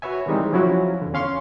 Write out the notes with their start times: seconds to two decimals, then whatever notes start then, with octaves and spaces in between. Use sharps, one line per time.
0.02 F#4 B4 C#5 E5 G#5
0.26 D#3 E3 G3 G#3 C4 D#4
0.53 F3 F#3 C#4 E4 F#4
1.02 E2 D3
1.14 C#4 F5 C6 C#6